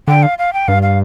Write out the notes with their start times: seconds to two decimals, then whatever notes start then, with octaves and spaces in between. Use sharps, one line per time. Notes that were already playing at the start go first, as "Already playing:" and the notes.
0.08 D3 G5
0.23 F5
0.39 F5
0.53 G5
0.68 G2 F5
0.83 F5